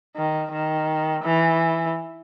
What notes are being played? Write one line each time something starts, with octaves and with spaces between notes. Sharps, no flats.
D#3
D#3
E3